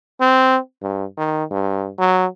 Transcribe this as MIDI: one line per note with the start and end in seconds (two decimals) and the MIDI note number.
0.21 0.58 60
0.82 1.05 43
1.17 1.44 51
1.51 1.89 43
1.98 2.26 54